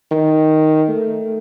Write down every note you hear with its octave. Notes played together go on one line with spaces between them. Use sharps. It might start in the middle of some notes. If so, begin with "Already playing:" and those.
D#3
A3